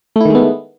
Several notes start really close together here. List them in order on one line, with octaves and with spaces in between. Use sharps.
A3 E4 D#3 G#3 B3